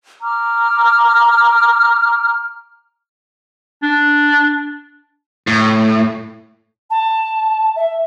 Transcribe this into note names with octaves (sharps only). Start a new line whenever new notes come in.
A#5 D6 F6
D4
A2
A5
E5